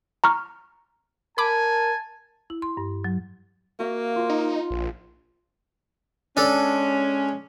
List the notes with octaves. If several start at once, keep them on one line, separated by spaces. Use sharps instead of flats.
A#5 C#6 F6
A#4 G#5 A5 B5 D6
E4
C6
G2
F#3
A#3 F#4 E5 F5
F4 C5
D#4
A#1
G#3 C#4 D4 A4